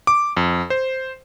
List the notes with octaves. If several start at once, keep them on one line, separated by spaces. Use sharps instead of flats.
D6
F2
C5